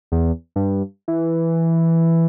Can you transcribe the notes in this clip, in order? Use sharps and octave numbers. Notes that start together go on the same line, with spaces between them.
E2
G2
E3